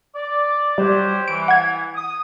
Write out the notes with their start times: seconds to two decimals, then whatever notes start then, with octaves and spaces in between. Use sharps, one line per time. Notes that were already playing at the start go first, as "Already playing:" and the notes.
0.15 D5
0.78 F#3 G3 G4 C5
1.28 E3 D7
1.48 F#5 G#6
1.95 D#6